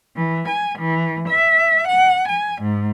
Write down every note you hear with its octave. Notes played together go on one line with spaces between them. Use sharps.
E3
G#5
E3
E5
F#5
G#5
G#2